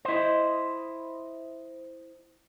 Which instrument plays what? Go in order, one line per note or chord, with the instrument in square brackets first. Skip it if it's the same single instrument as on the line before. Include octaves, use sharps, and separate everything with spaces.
[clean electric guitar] E4 C5 [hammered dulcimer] D#5